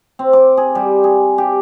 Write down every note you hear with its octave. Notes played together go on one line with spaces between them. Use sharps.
C4
D6
G#4
G3
G#4
G4